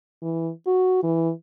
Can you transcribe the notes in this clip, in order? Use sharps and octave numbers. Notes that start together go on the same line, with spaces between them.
E3
F#4
E3